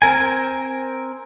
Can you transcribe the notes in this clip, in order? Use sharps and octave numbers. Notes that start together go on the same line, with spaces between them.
C4 A#4 G#5